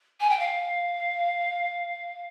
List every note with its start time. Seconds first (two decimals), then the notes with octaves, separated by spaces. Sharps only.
0.20 G#5
0.30 G5
0.39 F5